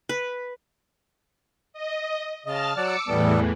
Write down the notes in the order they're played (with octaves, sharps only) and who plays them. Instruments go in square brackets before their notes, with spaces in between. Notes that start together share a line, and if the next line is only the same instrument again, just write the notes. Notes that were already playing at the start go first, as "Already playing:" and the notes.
[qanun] B4
[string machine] D#5
[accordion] C#3 D#5 [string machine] A5 F6 A6
[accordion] F#3 D5 F#5 [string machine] D6 E6 C#7
[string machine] E2 A2 E3 [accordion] G3 B3 A4